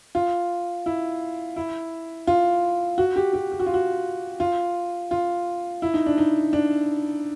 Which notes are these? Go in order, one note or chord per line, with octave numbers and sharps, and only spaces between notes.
F4
E4
E4
F4
F#4
G4
G4
G4
F#4
F4
F#4
F4
F4
E4
D#4
D4
D#4
D4